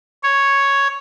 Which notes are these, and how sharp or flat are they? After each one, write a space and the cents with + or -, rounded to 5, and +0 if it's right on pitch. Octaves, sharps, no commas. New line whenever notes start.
C#5 +0